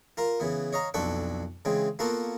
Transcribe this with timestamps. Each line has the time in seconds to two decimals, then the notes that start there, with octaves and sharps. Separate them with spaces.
0.17 F4 A#4 F5
0.40 C#3 E3 B3
0.73 C#5 D#5 F5 A#5
0.94 B1 F2 D4 A4 B4 C#6
1.65 C#3 E3 G#3 C4
1.99 A#3 B3 F4 F#4 A4 F5